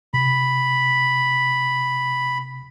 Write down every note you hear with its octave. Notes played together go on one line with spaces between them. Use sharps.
C3 B5